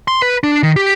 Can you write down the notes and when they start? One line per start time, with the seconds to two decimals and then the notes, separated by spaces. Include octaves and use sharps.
0.08 C6
0.22 B4
0.43 D4
0.63 D#3
0.76 G4